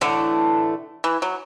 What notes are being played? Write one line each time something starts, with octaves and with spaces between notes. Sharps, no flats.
A2 D3 E3 A3 E4
E3
F#3